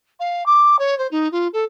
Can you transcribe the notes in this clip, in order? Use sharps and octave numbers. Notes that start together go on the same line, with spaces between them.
F5
D6
C#5
C5
D#4
F4
A4